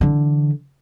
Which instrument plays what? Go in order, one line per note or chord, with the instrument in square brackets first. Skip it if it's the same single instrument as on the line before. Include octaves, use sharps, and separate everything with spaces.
[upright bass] D3 E3